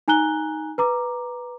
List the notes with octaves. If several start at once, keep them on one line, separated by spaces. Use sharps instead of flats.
D#4 G#5 A#5 F#6 G7
B4 A#5 D6